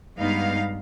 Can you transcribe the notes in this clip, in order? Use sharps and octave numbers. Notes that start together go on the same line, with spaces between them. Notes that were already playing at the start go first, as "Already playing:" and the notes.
G2 G#3 B3 D#4 F5